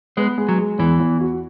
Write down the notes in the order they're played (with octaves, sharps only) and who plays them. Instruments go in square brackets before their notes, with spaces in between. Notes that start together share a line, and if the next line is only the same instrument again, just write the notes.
[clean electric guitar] G#3 [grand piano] B3
[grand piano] G#3
[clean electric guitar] F#3
[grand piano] G#3
[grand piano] E2 [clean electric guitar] E3
[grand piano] E2
F#4